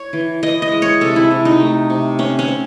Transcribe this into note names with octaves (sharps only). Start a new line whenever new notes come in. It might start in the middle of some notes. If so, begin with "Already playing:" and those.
Already playing: C#5
E3
E3 D#5
D#5
G#3
C#5
C3 A4
E4
C3
D#4
A3
C3
C4 C#4
C#4
C4